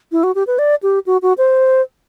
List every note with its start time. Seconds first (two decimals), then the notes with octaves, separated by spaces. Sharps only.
0.12 E4
0.23 F#4
0.35 G4
0.47 B4
0.59 D5
0.83 G4
1.06 F#4
1.22 F#4
1.38 C5